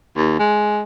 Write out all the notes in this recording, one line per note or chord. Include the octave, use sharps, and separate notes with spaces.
D#2
G#3